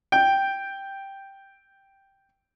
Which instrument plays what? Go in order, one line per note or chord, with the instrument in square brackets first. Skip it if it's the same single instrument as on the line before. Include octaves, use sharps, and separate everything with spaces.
[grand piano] G5 G6